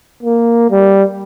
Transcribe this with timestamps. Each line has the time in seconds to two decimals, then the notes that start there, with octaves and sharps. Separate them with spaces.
0.23 A#3
0.71 G3